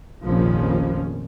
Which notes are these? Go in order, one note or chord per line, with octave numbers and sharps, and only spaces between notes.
F1 A#1 F2 D#3 F3 C#4